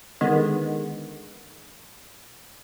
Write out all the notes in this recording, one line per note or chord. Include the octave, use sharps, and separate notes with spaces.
D3 D#3 G#3 B3